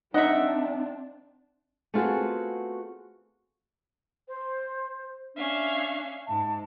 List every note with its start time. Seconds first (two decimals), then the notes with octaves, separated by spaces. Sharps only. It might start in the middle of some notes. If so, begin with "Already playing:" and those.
0.14 C4 D4 D#4 D#5 E5 F#5
1.94 A3 B3 C4 F4 F#4 G#4
4.28 C5
5.35 C#4 D4 E5 F5
6.27 G#2 A5